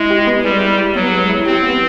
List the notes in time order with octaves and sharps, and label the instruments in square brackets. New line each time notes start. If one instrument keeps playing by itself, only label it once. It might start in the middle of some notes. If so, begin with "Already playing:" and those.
Already playing: [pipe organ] G#3 [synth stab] E4
[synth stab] G4
B3
[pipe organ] G3 [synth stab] G#3
[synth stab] E4
G4
[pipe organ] F#3 [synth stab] B3
[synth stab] G#3
E4
[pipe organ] C4 [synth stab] G4
[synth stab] B3